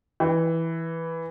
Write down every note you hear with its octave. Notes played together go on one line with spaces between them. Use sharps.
E3